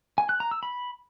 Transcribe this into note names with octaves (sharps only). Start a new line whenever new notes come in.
G#5
F#6
A#5
E6
B5